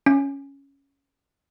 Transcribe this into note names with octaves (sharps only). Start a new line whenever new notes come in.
C#4